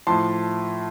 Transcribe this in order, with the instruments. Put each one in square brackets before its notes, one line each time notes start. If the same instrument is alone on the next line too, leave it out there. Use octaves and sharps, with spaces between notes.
[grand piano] A2 F3 A5 C6